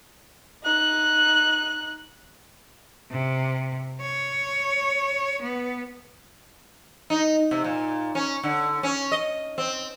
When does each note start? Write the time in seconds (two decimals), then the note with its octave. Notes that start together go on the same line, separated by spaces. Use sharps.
0.63 D#4 F#6
3.11 C3
4.01 C#5
5.42 B3
7.10 D#4
7.51 C3
7.64 A#2
8.15 C#4
8.43 D3
8.83 C#4
9.12 D#5
9.58 C4